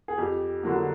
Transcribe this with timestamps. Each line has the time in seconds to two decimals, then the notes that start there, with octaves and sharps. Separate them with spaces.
0.08 G#4
0.18 F2 G4
0.63 D3 F#3 A#3